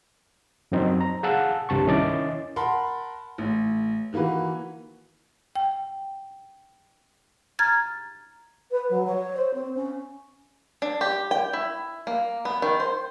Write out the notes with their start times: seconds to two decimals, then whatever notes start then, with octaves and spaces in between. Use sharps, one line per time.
0.72 F#2 F#3 C4 D#4
1.01 A#5
1.23 G#4 F5 F#5 A5 E6 F#6
1.69 C2 G2 C3 A5 C#6
1.87 D#3 C#4 E4 D#5 D6 A6
2.56 A#4 F#5 A5 B5 C6
3.38 A1
4.13 D#3 E3 A#3 F#4 B4
5.55 G5
7.59 A#5 F6 G#6 A6
8.71 B4
8.90 F#3
9.06 C#5
9.36 C5
9.54 C4
9.76 C#4
10.82 D4
11.01 G4
11.31 G5
11.53 E4
12.07 A#3
12.45 B3
12.62 D#3
12.80 C5